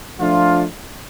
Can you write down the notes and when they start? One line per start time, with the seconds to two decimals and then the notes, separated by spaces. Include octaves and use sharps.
0.20 F3 A3 D4 F4